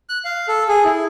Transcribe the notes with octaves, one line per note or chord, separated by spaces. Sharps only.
F#6
F5
A4
G#4
E4